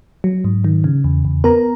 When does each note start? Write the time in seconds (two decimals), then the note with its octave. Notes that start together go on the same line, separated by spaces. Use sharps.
0.24 F#3
0.45 G#2
0.64 D#3
0.84 C#3
1.04 E2
1.25 E2
1.44 B3 A#4 A#5